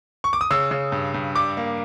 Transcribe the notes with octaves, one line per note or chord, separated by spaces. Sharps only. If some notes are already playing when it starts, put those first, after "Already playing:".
C#6
D6
D#6
C#3 E6
C#3
G2
G2
G3 D6
A#3